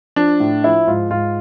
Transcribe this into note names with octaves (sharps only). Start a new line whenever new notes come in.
F3 D4
A2
F3 E4
G#2 F4
G#2 F4